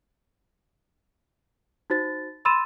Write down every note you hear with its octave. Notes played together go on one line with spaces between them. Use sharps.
D#4 F#4 C5 A6
B5 C6 E6 A6 D#7 E7